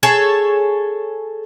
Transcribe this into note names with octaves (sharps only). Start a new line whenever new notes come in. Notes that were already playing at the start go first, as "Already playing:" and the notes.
G#4 A4 C#5 A5